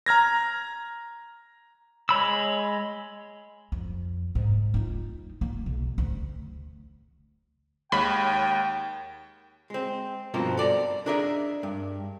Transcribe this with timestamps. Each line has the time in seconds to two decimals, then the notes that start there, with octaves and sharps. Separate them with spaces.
0.06 A#5 F6 G#6 A#6
2.09 G#3 C#5 B5 E6
3.72 F2
4.35 G#2
4.74 D#4 F4
5.41 A#3
5.66 B1
5.98 D2
7.92 D#2 G#3 C#5 F#5 G5 B5
9.70 G#3 C4
10.34 G2 B2 F3 A#3 C4
10.57 A4 D5 A5 A#5
11.06 D4 G#4 A#4 D#5 E5
11.63 G2